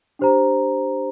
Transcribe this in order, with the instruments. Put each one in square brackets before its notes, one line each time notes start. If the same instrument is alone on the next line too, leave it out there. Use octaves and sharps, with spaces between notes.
[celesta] D4 G4 C5 A#5